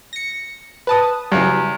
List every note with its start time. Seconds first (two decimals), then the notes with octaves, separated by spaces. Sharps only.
0.13 A#6 C#7
0.87 B4 A5 D#6
1.32 E2 C#3 F#3 G3